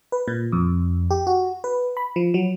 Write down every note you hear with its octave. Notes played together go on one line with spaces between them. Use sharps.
B4
A#2
F2
G4
F#4
B4
B5
F3
F#3